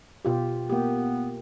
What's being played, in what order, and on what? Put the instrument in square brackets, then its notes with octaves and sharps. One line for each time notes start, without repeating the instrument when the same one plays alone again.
[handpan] B2 F4 G4
[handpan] A#3 G4 [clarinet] B3